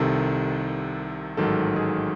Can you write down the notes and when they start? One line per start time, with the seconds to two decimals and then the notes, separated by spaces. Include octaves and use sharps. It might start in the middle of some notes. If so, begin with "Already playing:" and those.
Already playing: C2 C3 D#3 A4
1.37 A1 G#2 D#3 F#3 A4
1.76 G#4